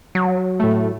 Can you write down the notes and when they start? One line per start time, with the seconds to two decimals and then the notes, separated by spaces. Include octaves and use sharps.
0.15 F#3
0.60 A2 A3